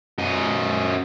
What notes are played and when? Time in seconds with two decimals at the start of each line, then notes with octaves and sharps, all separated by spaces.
0.18 F#2 D#5